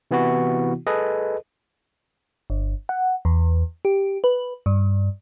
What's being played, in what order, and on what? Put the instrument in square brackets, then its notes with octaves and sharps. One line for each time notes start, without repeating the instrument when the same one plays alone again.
[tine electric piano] C3 E3 B3 E4 F#4
G#4 A4 B4 D#5
[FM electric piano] G1
F#5
E2
G4
B4
G2